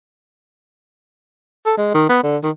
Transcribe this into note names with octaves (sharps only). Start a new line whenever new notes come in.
A4
G#3
D#3
B3
D3
D#3